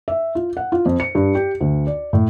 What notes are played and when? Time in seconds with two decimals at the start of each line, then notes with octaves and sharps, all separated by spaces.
0.08 E5
0.35 F4
0.57 F#5
0.72 F4
0.86 F2
1.00 C#7
1.15 G2
1.35 G4
1.61 D2
1.87 D5
2.13 A2